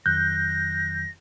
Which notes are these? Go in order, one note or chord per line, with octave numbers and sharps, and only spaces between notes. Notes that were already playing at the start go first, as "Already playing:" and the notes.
F2 D#3 F#3 F#6 G6 A#6